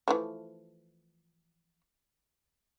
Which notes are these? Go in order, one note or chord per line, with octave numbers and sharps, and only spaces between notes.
E3 F3 A3